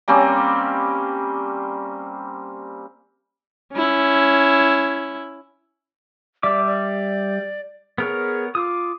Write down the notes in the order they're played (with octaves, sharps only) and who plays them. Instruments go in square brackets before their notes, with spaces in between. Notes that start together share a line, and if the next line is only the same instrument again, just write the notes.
[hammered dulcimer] G3 A#3 C4 C#4
[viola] C#4 E4
[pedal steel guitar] G3 E5 D6 [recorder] D5
[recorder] D5
[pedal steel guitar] B3 A#4 C#5 [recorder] G#4
[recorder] F4 [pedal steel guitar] D6 D#6